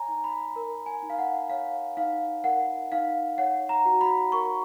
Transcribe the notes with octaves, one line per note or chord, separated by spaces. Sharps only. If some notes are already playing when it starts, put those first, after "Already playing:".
Already playing: C#5 G#5 A#5
D#4
B5
A#4
G#5
D#4
F5
F#5
C#5 F5
D#4 F5
A#4 F#5
D#4 F5
C#5 F#5
A#5
F#4
B5
A#4 C#6